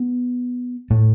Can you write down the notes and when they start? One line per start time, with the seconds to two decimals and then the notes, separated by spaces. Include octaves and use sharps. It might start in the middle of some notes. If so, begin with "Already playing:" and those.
Already playing: B3
0.90 A2 A3